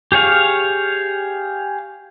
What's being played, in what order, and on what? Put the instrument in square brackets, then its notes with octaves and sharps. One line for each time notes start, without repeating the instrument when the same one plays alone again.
[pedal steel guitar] G4 G#4 C#5 F5